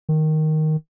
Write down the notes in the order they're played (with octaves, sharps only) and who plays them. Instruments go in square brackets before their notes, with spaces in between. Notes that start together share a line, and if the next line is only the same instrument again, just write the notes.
[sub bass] D#3